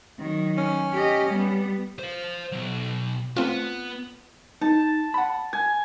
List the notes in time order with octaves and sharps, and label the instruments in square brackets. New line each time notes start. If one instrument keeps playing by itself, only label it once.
[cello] D#3 F#3
[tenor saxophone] C#4
[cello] G4 D#5
G3 B3
[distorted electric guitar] C5 F5
B2 F#3
[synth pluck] A3 C4 F4 [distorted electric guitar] B3
[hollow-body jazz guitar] D#4 [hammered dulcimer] A5
[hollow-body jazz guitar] F#5 B5
[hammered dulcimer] G#5